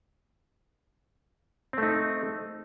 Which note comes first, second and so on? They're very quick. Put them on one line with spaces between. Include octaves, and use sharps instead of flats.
C4 A3 D#4